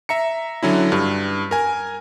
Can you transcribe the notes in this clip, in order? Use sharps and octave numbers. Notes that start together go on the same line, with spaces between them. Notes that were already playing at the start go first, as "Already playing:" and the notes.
E5 A#5 C#7
D3 F#3 C#4 E4
G2
A#4 G#5